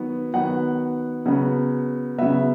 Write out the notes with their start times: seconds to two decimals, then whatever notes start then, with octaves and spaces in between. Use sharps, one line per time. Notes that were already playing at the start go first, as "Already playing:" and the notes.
Already playing: D#3 F#3 B3
0.33 D#3 F#3 B3 F#5
1.26 C#3 F#3 B3
2.18 C#3 F#3 B3 E5